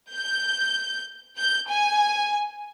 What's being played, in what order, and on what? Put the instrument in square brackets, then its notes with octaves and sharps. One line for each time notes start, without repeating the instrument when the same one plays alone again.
[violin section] G6
G6
G#5